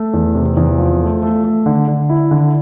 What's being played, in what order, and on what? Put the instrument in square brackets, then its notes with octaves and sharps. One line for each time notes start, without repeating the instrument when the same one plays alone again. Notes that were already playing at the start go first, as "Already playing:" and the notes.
Already playing: [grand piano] A3
E2
C3
E2
F3
A3
A3
A3
D3
D3
E4
D3